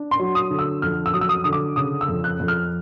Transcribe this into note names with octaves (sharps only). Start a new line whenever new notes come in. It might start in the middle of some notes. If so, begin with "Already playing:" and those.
Already playing: D4
C6
F#3
D#6
D3
E6
F2 F6
E6
F#3 D#6
E6
D#6
D3 D#6
D6
C#3 D#6
E6
F2
F#6
F2
F6